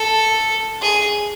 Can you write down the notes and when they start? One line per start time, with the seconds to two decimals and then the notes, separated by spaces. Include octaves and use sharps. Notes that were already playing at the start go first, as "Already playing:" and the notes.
Already playing: A4
0.82 G#4